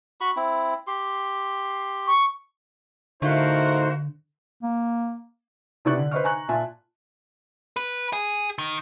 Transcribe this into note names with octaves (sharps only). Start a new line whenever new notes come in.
F#4 B5 C#6
C4 E4
G4 C6
C#6
A2 D3 A3 D#4 F#4 A#4 C5 F5
A#3
C3 B3 E4 D5 C#6 F#6
D3
B4 C5 D#5 C#6 F6
G#5 A#5 C#6 F#6
A#2 F4 E5 G#5 A5
B4
G#4
D#3